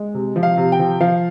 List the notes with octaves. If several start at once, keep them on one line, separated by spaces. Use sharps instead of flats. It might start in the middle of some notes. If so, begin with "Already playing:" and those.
Already playing: G#3
C3
F3
F5
C3
G5
F3
F3 F5